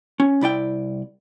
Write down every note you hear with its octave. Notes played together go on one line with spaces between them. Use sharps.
C#4
C2 E4 D5 G5